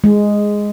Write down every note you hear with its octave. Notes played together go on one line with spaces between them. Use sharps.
G#3